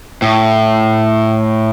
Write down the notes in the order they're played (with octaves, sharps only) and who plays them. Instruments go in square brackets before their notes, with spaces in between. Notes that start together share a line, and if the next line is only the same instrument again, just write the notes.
[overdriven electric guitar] A2